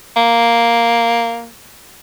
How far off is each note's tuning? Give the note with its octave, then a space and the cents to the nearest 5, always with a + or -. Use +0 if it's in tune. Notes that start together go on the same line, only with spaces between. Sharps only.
A#3 +0